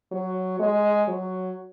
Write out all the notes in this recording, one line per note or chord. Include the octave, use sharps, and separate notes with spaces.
F#3
G#3
F#3